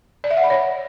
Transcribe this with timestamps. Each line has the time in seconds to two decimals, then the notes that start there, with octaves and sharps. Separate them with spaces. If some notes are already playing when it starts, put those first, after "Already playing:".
0.24 D5
0.30 E5
0.37 F#5
0.44 B5
0.50 C#5